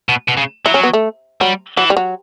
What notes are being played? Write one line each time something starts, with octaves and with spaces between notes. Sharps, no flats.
B2
B2
C#3
F#3 E4
C#4
B3
A3
F#3 G3
E3 F#3
G3
F#3